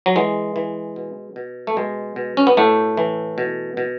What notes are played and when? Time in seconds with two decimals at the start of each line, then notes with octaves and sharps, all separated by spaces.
0.06 F#3
0.16 E3 G#3
0.56 E3
0.96 B2
1.36 B2
1.67 A3
1.77 B2 G#3
2.16 B2
2.37 C#4
2.47 B3
2.57 A2 A3
2.97 E3
3.38 B2
3.77 B2